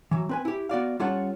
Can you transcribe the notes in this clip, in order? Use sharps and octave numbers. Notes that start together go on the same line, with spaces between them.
E3 F#3
C4 B4 G#5
E4 G4
B3 F#4 D5 F5
G3 C#4 F4 A4 C#5 F#5